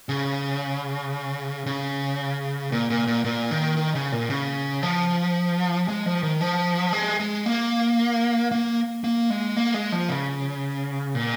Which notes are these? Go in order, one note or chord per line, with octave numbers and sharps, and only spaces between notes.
C#3
C#3
A#2
A#2
A#2
A#2
D#3
D#3
C#3
A#2
C#3
F3
G#3
F3
D#3
F3
G#3
G#3
A#3
A#3
A#3
G#3
A#3
G#3
F3
C#3
A#2